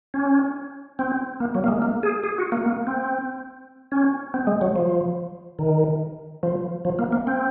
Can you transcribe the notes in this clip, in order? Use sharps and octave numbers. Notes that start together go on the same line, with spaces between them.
C#4
C4
A#3
F#3
A#3
G#3
A#3
G#4
G#4
F#4
A#3
A#3
C4
C#4
C4
G#3
F#3
F3
D#3
F3
F3
A#3
A#3
C4